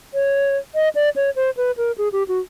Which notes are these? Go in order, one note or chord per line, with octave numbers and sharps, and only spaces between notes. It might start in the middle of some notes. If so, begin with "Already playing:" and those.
C#5
D#5
D5
C#5
C5
B4
A#4
G#4
G4
F#4